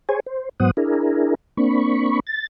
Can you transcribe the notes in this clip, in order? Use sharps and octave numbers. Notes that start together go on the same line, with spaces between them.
G#4 C5 C#5 G#5
C5
G#2 F#3 B3 C5 F#5 D#6
D4 E4 G#4 A#4
A#3 C4 D4 B5 C#6
A6